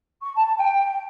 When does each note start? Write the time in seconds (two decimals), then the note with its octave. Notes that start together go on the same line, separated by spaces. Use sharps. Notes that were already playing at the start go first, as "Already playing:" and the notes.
0.21 C#6
0.35 A5
0.58 G5